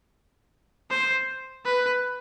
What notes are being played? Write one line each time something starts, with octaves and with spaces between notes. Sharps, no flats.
C5
B4